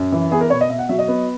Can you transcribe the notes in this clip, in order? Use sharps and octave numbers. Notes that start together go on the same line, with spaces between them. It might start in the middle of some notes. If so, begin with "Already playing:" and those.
Already playing: F#2
E3
B3 G#4
A#4
B2 C#5
D#5
B2 E5
F#5
F#3 E5
D#5
B3